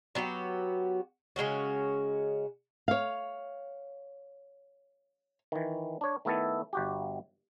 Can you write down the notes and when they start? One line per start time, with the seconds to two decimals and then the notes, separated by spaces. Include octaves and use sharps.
0.15 F#3 B3 F#4 G4
1.36 C#3 G#3 C#4 F#4
2.88 C#5 F5
5.52 D#3 E3
6.01 D4 C#5
6.25 D#3 A3 B3 E4 A4
6.73 G1 F#4 G4